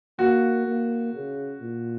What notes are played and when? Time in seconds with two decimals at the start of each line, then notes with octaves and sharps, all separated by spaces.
0.19 A#3 F#4
0.66 A#3
1.13 C#3
1.61 A#2